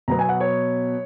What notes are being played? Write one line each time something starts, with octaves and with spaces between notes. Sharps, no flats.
B2 F#3 B3 A#5
G#5
F#5
C#5